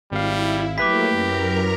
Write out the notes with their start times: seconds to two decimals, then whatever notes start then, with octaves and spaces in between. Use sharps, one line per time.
0.12 G#1 G3 E4 F5
0.78 F#3 A3 A#3 E4 G4 B4 D6 B6
1.10 F#2 A#4 A#5